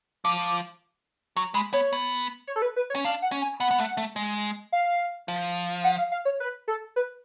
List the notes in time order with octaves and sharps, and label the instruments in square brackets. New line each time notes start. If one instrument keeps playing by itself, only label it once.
[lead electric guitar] F3 [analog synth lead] D6
[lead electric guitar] F#3 [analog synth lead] C#6
[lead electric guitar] G#3 [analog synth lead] B5
[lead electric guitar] B3 [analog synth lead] C#5
[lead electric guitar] B3
[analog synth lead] C#5
A4
B4
B4
C#5
[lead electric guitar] C#4
[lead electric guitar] D4 [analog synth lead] F5
[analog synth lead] F#5
[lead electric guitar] C#4
[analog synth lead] G#5
[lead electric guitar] B3 [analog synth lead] F#5
[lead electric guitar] B3
A3
A3
G#3
[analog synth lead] F5
[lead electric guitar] F3
[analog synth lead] F#5
F5
F5
C#5
B4
A4
B4